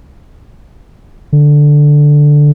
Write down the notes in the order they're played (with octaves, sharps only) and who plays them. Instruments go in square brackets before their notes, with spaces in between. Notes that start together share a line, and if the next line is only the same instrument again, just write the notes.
[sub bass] D3